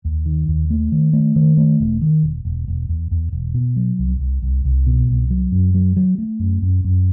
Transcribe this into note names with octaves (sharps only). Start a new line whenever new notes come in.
D#2
D#3
D#2
A3
D#3
A3
D#3
A3
E1
D#3
E1
E1
E1
E2
E2
E1
B2
F#3
C2
C2
C2
C2
B2
C2
F#3
F#2
F#3
F#3
A3
F#2
F#2
F#2